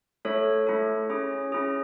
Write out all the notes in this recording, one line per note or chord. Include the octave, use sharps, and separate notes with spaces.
A3 E4 A4 C#5
A3 E4 A4
C#4 E4 G#4
C#4 E4 G#4